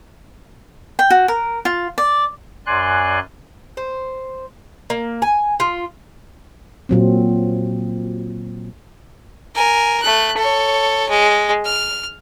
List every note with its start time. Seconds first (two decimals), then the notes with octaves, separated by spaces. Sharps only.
0.99 G5
1.10 F#4
1.28 A#4
1.65 F4
1.98 D5
2.67 F#2 D5 G#5 C6 F#6
3.77 C5
4.90 A#3
5.22 G#5
5.60 F4
6.89 A#2 F#3 C4
9.55 A#4 G#5
10.02 A3 F#6
10.37 A4 C#5
11.09 G#3
11.65 F6